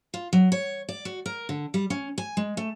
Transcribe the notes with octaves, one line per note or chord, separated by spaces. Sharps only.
F4
F#3
C#5
D5
F#4
A#4
D3
G3
C#4
G#5
G#3
A3